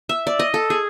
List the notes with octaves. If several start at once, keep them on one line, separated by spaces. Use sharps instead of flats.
E5
D5
D#5
A4
G#4